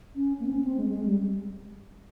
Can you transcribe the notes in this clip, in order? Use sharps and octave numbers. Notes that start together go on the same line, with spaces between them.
C#4
A#3
C4
C#4
C4
G#3
G#3
G3